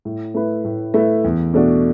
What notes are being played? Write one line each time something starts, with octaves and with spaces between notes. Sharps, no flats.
A2
A3 E4 B4
A2
A3 E4 B4
E2
B2 A3 D4 F#4